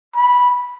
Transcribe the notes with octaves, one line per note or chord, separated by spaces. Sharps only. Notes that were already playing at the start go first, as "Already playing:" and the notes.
B5